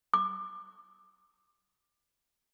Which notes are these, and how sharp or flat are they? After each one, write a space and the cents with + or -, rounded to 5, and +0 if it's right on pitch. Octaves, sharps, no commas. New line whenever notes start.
D6 +20